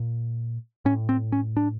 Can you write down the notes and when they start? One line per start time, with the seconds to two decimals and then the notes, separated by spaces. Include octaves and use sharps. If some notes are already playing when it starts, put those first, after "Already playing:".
Already playing: A#2
0.85 A2 C#4
1.09 C4
1.32 C#4
1.57 D4